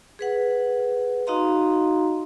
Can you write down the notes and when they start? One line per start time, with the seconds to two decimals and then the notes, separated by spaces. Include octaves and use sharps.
0.19 G#4 B4 F#5
1.27 D#4 F#4 D#5 F5 A#5 C6